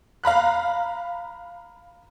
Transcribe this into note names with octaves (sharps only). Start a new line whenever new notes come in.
F5 A#5 B5 F#6